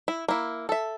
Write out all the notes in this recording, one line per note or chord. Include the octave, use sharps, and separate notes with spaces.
E4
A#3 E4
A4 E5